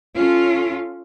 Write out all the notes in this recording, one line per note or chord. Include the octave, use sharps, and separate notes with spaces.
C#4 F4 A4